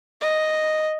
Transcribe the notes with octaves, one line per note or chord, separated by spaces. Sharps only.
D#5